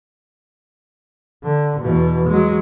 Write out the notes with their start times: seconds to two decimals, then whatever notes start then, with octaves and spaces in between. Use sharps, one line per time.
1.43 D3
1.80 E2 B2
2.28 F#3 G#3